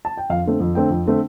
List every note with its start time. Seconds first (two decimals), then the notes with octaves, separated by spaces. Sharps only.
0.05 A5
0.17 G5
0.30 F2 F5
0.45 D3 A3 C4
0.60 F2
0.75 D3 A3 C4 G5
0.90 F2
1.06 D3 A3 C4